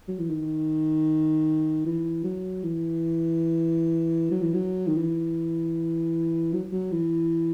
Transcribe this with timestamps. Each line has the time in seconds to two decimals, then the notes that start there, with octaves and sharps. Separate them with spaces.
0.08 F#3
0.19 E3
0.30 D#3
1.86 E3
2.24 F#3
2.63 E3
4.31 F#3
4.42 E3
4.54 F#3
4.87 D#3
4.97 E3
6.53 F#3
6.72 F#3
6.92 E3